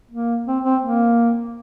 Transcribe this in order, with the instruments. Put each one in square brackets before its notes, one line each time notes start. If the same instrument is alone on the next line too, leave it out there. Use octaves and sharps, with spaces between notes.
[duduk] A#3
C4
C4
A#3